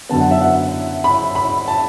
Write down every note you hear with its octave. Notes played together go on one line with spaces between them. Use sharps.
F#2 D3 B3 A5
F#5
E5
F#5
B5
B5
A5